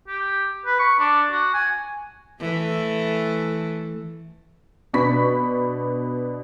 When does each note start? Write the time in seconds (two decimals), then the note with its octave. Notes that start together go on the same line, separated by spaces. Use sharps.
0.08 G4
0.66 B4
0.80 C#6
1.00 D4
1.31 F#4
1.54 G#5
2.41 E3 A3 A4
4.94 B2 D4 B5 C#6 B6